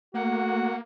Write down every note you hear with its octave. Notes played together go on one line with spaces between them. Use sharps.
A3 A#3 F#4 F#5